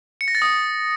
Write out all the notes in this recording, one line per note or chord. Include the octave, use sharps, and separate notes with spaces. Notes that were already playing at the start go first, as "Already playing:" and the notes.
C#7
A#6
A6
D#6